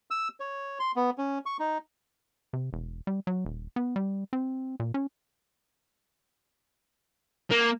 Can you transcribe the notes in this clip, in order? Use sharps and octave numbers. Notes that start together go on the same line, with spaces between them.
E6
C#5
C6
B3
C#4
C#6
D#4
C3
E1
G3
F#3
D#1
B3
G3
C4
A#2
C#4
A#3